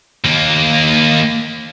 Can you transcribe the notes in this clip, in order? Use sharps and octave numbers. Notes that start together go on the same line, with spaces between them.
D#2 A#3